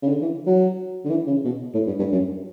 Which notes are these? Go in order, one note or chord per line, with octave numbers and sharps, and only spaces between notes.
C#3
D3
E3
F#3
D3
E3
C#3
B2
A2
G2
G2
F#2